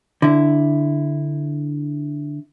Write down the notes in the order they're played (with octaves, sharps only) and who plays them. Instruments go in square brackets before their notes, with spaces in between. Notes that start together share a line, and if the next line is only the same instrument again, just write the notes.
[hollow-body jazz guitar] D3 E4